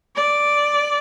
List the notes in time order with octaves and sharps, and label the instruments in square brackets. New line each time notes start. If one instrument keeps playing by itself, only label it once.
[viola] D5